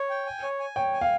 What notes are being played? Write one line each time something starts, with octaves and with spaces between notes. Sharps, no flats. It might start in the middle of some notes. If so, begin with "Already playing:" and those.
Already playing: C#5
G5
G#5
C#5
G#5
C#5 G5
G#5
F5